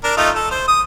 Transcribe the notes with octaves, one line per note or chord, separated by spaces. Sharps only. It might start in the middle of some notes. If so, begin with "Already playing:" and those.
D4 A#4
A3 D#4 F4
A4
C5
D#6